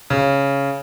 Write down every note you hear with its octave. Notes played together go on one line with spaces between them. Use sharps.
C#3